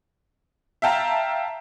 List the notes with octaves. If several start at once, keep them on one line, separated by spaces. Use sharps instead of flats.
E5 F5 G5 A5 A#5